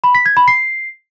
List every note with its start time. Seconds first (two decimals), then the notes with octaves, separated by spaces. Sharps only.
0.04 B5
0.15 B6
0.26 G#6
0.37 B5
0.48 C7